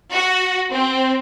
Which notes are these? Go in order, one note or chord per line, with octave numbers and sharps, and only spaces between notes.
F#4
C4